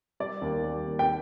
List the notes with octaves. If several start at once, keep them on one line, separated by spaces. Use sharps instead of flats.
G3 D5
D#2
G3
D#2
G5